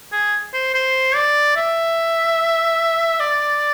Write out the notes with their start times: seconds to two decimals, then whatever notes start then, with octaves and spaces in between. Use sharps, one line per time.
0.12 G#4
0.54 C5
0.74 C5
1.16 D5
1.56 E5
3.20 D5